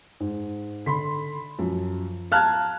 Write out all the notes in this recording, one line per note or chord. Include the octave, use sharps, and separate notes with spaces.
G#2
D3 B5 C6 B6
F#2 F3
F5 A5 A#5 F6 F#6 G#6